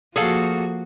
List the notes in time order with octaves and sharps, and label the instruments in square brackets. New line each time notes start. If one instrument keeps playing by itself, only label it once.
[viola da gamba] F3 A#3 F#4 [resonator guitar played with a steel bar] G#4 A4 F5